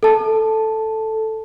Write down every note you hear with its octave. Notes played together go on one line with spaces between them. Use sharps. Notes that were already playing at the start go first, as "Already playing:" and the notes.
A4 A5